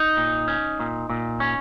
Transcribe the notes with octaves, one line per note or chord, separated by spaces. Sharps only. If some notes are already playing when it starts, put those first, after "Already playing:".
Already playing: D#4
A#2
C#4
A#2
A#2
C#4